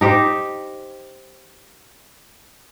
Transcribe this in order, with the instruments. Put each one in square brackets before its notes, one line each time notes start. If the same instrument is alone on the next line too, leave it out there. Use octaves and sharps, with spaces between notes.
[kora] D#4 G4 C5